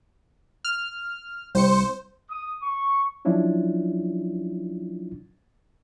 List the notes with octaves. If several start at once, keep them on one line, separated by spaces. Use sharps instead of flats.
F6
C2 C5 C#7
D#6
C#6
F3 F#3 C#4 D4 E4 F4